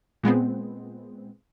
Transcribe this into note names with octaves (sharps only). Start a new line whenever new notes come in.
A#2 G#3 B3 C4